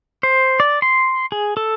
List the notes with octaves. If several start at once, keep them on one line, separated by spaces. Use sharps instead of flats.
C5
D5
C6
G#4
A4